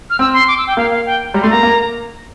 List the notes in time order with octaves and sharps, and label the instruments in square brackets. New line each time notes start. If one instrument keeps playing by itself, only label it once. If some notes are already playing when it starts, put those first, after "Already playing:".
[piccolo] F6
[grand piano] C4 [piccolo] E6
[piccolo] C6
D6
E6
G5
[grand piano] A#3 [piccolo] F5
[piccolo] F5
G5
[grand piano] G3 [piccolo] A#5
[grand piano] A3 [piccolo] C6
[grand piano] A#3 [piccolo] A#5
[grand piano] A#3